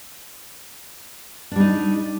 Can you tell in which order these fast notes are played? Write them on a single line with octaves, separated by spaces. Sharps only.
D4 G3 D#4